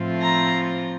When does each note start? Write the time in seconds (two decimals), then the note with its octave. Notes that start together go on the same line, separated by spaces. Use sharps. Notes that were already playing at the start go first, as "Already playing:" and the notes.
Already playing: A2 F3 A3 C4 F4
0.22 A#5